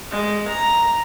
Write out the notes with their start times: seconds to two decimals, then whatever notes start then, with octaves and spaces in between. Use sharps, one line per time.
0.11 G#3
0.48 A#5